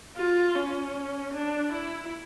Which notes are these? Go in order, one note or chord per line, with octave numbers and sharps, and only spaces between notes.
F4
C#4
D4
E4